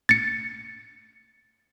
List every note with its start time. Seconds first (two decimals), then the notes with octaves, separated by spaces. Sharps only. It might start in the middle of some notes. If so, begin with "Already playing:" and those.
0.09 A6 C#7